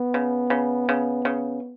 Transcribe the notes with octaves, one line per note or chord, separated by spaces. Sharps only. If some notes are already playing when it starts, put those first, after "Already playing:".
Already playing: B3
C#3
C#3
C#3
C#3